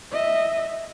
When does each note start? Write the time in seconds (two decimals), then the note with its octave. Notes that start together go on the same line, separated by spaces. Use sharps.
0.12 D#5 E5